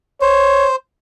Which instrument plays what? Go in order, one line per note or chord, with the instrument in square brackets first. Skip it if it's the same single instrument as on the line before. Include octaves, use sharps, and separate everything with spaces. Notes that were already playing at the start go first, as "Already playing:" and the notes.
[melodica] C5 [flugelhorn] C#5